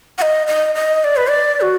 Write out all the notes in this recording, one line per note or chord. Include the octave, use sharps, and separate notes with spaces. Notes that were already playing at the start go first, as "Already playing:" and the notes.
F#5
D#5
D#5
D#5
D5
B4
D5
F#4